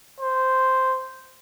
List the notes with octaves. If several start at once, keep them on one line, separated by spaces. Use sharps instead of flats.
C5